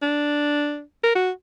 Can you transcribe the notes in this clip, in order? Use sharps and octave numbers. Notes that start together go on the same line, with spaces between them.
D4
A#4
F#4